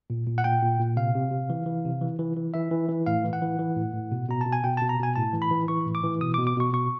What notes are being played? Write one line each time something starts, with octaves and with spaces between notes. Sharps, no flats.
A#2
A#2
F#5
A#2 G5
A#2
A#2
C3 F5
C3
C3
E3
E3
C3
E3
E3
E3
E3 E5
E3
E3
A2 F5
E3
F#5
E3
E3
A2
A2
B2
B2 A#5
B2 A5
G#5
B2 G5
A5
B2
A#5
B2 G#5
A2 A5
E3
B5
E3
E3 C#6
A2
D6
E3
B2 D#6
B2 D6
D6
B2 C#6
B2 C#6